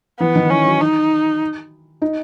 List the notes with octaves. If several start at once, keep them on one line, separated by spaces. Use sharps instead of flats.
E3 B3
D#3
E3 C#4
F#3
D#4
D#4